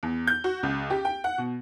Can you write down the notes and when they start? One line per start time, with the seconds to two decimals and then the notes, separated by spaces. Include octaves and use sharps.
0.03 E2
0.27 G6
0.44 F#4
0.63 C#2
0.90 G4
1.05 G5
1.24 F#5
1.38 B2